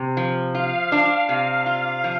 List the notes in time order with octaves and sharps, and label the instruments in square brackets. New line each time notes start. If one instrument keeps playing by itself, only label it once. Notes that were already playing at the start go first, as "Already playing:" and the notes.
Already playing: [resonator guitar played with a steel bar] C3
F3
[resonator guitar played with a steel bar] F4 [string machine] F5
[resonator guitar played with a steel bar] D4
C3
F4
F3